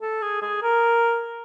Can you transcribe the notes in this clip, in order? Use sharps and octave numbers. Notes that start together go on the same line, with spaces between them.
A4
G#4
G#4
A#4